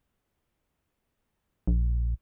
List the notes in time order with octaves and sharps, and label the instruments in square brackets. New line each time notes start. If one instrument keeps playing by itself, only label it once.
[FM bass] A#1